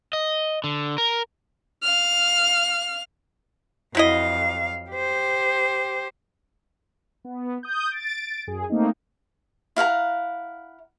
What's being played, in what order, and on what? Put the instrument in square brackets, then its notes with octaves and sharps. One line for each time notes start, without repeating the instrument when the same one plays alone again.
[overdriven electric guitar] D#5
D3
A#4
[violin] F5 F6
[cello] F2 F5 [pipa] F#3 E4 D#5
[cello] G4 C5
[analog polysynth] B3
D#6 G6
A6 D7
F#2 G#4
A3 A#3 C4 D#4
[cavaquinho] E4 F5 F#5 A#5